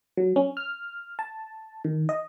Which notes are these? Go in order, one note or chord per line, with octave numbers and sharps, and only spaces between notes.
F#3
C#4
F6
A5
D#3
D#5